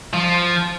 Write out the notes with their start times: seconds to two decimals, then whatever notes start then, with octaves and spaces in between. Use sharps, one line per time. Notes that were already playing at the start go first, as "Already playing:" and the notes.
0.13 F3